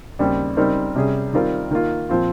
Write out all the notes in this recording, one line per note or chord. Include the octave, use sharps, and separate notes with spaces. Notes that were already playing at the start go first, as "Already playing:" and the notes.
D#2 C#3 G3 C4
C#3 G3 C4 D#4 A#4
C3 G3 C#4 G#4
D#3 G3 C4 F4 A#4
D#3 A#3 F4
A#2 F3 C4 F4